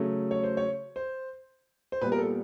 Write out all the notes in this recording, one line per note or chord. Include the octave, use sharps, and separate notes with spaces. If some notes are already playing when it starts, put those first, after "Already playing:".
Already playing: C#3 F#3 A3
C#5
C5
C#5
C5
C5
A#2 G3 B3 B4
A#4
A4